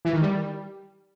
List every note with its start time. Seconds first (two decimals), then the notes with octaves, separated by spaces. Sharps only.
0.05 E3
0.13 D#3
0.22 G3